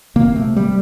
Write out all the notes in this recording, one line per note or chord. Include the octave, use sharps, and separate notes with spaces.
C3 A#3
A3
C3
G3